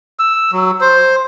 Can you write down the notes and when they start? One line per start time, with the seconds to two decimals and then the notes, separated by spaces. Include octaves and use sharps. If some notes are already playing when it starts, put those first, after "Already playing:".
0.19 E6
0.52 F#3
0.81 C5